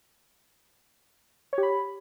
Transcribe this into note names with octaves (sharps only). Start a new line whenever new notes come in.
C#5
G4
B5